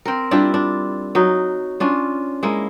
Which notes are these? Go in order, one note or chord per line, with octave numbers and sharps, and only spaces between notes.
C4 A#4
G3 D4 E4 F4
D4
F#3 D#4
C#4 D4 F4
G#3 A#3 E4